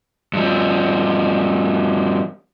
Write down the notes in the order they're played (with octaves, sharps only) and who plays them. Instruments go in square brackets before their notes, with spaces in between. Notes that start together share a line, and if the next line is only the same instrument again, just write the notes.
[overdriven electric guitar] G2 F3